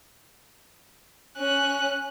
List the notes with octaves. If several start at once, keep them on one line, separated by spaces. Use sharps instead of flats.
C#4 F#6